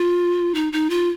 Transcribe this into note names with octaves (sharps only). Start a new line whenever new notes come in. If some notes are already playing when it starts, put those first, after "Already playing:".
Already playing: F4
D#4
D#4
F4